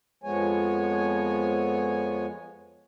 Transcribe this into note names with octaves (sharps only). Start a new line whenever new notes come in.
F2 F3 G#3 B3 C#5 G#5